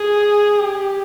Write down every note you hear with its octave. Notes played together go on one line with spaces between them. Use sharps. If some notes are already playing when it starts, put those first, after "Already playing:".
Already playing: G#4
G4